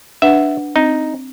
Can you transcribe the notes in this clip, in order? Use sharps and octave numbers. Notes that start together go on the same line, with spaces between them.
D4 B4 E5 F#5
C4 D#4